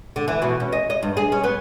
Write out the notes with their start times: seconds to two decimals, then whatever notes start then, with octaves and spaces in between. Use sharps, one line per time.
0.16 D3
0.28 E3
0.42 B2
0.60 C#4
0.73 D#5
0.90 D#5
1.03 G2
1.17 G#4
1.32 C#4
1.44 B3